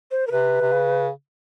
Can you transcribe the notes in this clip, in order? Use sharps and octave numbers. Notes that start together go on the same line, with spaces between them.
C5
A#4
C3 B4
C3
C#3